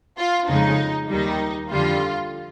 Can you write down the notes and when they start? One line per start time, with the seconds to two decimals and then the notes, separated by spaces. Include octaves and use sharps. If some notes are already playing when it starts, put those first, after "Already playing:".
0.19 F4
0.49 F2 C#3 F3 G#3 D#4
1.09 D#2 D#3 G3 D#4
1.71 F2 D3 G3 F4